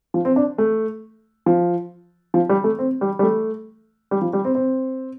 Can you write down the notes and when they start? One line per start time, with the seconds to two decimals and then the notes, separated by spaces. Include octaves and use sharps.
0.14 F3
0.25 C4
0.36 D4
0.58 A3
1.46 F3
2.34 F3
2.49 G3
2.64 A3
2.79 C4
3.01 G3
3.19 G3
3.23 A3
4.11 G3
4.21 F3
4.33 G3
4.45 C4
4.55 C4